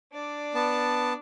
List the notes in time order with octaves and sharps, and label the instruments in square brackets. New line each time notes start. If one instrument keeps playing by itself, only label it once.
[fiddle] D4 D5
[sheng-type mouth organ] B3 A5